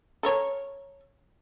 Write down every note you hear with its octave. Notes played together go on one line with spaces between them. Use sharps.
A4 A#4 C#5